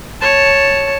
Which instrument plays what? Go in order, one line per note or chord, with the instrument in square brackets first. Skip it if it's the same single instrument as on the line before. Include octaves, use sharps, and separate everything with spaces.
[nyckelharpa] C#5 A5